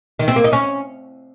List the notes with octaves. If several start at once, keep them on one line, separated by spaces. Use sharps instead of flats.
D#3
C4
A#3
D#4
C#4